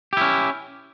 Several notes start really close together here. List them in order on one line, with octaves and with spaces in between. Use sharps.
G4 E4 C#4